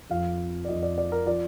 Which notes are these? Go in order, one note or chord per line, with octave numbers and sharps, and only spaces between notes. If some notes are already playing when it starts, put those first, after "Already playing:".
F2 F3 F5
D5
F2 F3 D#5
D5
D5
A#4
F3 D5